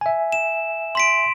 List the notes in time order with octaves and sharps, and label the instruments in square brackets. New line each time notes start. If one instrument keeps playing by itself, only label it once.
[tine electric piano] E5 G#5
[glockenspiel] E7
C6 B6 D7